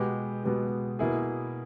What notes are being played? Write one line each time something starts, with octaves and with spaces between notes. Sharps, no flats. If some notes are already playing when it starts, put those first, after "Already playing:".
Already playing: B2 G#3 B3 G4
B2 G#3 B3 G4
B2 A#3 E4 G#4